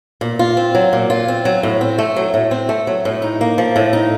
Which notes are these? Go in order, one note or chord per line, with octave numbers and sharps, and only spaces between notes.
A#2
F4
C4
F#3
A#2
F4
C4
F#3
A2
C4
A3
F#3
A2
C4
A3
F#3
A2
D#4
A#3
F3
A2
D#4